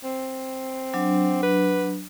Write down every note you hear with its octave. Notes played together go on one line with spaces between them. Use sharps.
C4
F#3 D4
B4